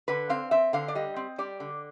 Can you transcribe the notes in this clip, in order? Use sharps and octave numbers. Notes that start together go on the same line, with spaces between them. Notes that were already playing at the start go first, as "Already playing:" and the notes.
D3 B4
C4 F5
C4 E5
D3 F5
D5
G3 D#5
C4
G3 D5
D3